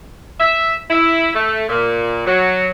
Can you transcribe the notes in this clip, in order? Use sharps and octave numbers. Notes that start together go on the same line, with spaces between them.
E5
E4
A3
A#2
F#3